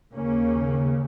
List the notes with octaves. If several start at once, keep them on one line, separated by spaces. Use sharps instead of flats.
D#2 C#3 A#3 C#4